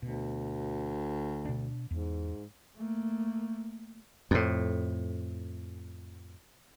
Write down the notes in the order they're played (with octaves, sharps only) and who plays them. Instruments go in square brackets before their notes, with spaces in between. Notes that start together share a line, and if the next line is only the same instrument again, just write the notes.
[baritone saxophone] D2 [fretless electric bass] B2
[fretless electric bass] B2 D4
[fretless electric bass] E2 [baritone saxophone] G#2
[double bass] A3 A#3
[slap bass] F2 A2